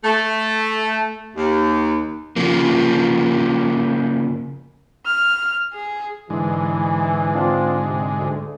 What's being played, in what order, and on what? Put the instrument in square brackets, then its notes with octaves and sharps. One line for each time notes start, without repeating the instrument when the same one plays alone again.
[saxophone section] A3
D#2
[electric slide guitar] C#3 F3 A#3
[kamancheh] F6
G#4
[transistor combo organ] G#2 D3 G#3 [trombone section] E3
[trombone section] C4 D4 F4
C3
D2